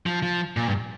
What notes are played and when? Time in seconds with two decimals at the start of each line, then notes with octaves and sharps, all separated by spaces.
0.06 F3
0.23 F3
0.57 A#2
0.68 G2